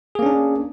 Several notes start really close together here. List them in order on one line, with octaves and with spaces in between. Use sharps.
G#4 A#3 C#4 D4